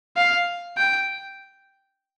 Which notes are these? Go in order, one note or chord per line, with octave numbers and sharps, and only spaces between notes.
F5
G5